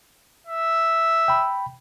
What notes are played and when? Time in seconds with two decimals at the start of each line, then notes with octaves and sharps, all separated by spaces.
0.47 E5
1.28 G5 B5